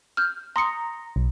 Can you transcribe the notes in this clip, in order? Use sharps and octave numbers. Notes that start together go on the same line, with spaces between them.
F6 G6
A#5 C6 D#6 C#7
B1